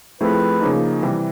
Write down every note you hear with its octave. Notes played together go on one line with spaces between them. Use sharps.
F3 A3 C4 E4 G#4 B4
C#3 F3 A#3 D#4
C3 E3 G3